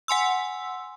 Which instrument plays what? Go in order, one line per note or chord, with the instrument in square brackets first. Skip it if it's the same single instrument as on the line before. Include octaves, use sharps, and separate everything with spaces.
[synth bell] F#5 G#5 C6 E6